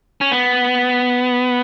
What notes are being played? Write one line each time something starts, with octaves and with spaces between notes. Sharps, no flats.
C#4
B3